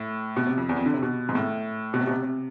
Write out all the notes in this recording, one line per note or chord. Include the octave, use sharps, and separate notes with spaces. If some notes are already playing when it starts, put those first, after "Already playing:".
Already playing: A2
B2
C3
F2
E2
F2
D3
C3
B2
G#2
A2
B2
C3
B2
C3
C3